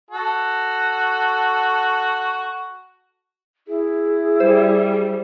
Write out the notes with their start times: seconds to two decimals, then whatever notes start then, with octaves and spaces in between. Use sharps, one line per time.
0.11 F#4 A4
3.68 E4 G#4
4.40 G3 C5